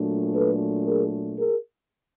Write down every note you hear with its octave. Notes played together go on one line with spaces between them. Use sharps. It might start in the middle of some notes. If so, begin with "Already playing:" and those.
Already playing: A#2 F#3 A3 D4
A4 B4
G#4 A#4
G#4 A#4